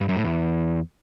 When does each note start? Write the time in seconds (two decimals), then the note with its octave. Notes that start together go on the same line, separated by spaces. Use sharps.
0.01 G2
0.09 F#2
0.17 A2
0.24 E2